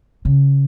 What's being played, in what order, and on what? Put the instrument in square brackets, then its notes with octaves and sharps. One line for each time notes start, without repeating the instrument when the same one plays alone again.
[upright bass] C#3